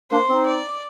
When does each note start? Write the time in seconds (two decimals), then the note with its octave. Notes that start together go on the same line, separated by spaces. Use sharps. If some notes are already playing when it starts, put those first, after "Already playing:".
0.11 A#3 D4 C5
0.29 C4 D#4
0.46 D5